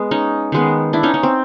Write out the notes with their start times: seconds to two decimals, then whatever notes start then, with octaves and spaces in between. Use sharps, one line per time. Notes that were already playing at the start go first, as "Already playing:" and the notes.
Already playing: G#3 B3
0.11 C#4 D#4
0.52 D#3 G#3 B3
0.93 D4 E4
1.03 C#4 D#4
1.14 C#4
1.23 C4